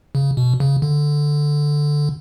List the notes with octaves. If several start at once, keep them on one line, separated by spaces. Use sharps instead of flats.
C#3
B2
C#3
D3